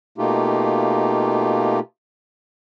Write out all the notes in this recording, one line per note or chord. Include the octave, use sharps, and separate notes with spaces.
B2 A3 A#3 D#4 F4 G4